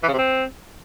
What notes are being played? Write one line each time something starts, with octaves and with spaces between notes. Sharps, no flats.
E3
C#3
C3
C4